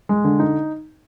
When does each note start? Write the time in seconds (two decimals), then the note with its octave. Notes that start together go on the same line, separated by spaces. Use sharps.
0.09 G#3
0.24 D3
0.40 D#4